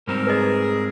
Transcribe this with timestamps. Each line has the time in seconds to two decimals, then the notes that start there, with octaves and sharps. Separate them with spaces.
0.08 G#2 G3 C4 A#4
0.27 G#4 B4 D#5